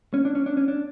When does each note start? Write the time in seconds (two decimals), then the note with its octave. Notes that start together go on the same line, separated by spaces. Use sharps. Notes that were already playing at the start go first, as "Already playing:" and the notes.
0.14 C#4
0.25 D4
0.35 C#4
0.46 D4
0.57 C#4
0.68 D4